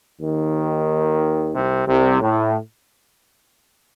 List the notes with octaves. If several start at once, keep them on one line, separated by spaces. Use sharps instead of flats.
D#2 D#3
C2 C3
C2 C3
A2